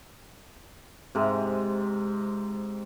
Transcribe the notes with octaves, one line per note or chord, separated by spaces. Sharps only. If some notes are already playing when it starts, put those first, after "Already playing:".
G#2 C3